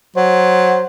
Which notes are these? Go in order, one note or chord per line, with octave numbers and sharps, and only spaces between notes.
F#3 C5